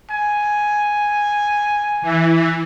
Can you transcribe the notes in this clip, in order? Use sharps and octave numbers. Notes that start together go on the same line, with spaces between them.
G#5
E3